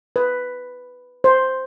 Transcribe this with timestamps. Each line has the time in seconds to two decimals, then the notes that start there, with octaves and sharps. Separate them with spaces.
0.16 B4
1.24 C5